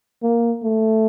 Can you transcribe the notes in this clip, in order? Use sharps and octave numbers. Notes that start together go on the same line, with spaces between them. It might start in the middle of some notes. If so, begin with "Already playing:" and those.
A#3
A3